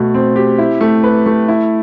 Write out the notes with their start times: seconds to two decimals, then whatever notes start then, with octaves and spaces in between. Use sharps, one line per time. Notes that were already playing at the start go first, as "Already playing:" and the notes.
Already playing: B2 A3
0.14 C4
0.36 G4
0.58 E4
0.81 A3
1.03 B4
1.26 A3
1.48 E4